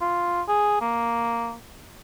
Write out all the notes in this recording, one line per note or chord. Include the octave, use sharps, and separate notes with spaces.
F4
G#4
A#3